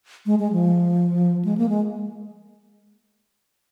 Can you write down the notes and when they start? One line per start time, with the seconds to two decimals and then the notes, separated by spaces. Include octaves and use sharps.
0.26 G#3
0.39 G#3
0.53 F3
1.45 G#3
1.58 A#3
1.69 G#3